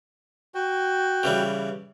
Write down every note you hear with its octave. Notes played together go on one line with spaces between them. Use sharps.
F#4 G5
C#3 E3 G3